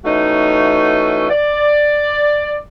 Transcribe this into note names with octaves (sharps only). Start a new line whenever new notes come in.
E3 A3 C#4 D#4 F#4
D5